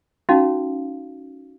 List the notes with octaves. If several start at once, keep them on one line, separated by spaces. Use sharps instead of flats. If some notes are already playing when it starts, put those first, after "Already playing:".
C#4 D#4 F#4 F5